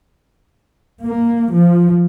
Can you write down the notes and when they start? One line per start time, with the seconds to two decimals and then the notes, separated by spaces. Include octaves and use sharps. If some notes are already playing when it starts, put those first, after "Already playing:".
1.03 A#3
1.53 F3